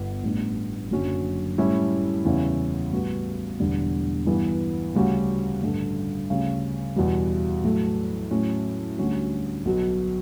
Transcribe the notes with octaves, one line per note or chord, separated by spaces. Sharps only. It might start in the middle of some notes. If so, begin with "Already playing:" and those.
Already playing: G1 B3
A1 A2 G3 B3 D4
F#1 F#2 D3 F#3 C#4
A2 G3 C#4 E4
E2 C#3 G3 C#4 E4
A1 A2 G3 B3 F#4
E1 E2 D3 G3 D4
G2 E3 B3
D2 C#3 G3 C#4 F#4
A1 G2 D3 A3
D2 C#3 G3 C#4
E2 B2 G3
A2 F#3 A3
A2 F#3 C#4
D2 D3 G3 C#4 F#4
B1 B2 F#3